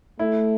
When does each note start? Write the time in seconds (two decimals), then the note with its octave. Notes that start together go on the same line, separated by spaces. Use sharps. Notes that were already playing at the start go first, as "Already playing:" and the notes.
0.19 A3 E4